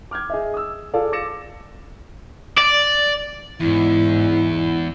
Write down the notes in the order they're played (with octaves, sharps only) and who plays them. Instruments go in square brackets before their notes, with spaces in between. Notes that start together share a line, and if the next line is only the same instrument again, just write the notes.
[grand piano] D6 F6 G6 G#6
G#4 D#5 E5
D#6 E6
F4 G#4 A4 D5 F5
D6 E6 A6 A#6 C#7 E7
[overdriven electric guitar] D5
[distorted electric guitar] E2 [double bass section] G#2 [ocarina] E4